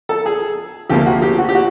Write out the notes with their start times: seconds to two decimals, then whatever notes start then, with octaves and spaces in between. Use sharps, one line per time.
0.09 A4
0.26 G#4
0.89 D2 C3 F3 A#3 G4
1.06 F#4
1.22 G4
1.38 F#4
1.49 G4
1.55 F#4